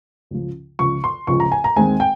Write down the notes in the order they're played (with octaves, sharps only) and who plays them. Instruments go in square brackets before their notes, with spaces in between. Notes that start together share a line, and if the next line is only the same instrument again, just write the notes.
[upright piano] C#2 C#3 F3
C#2 C#3 F3 C#6
C6
C#2 C#3 F3 C#6
A#5
G#5
A#5
D#2 D#3 G#3 C4 G#5
G5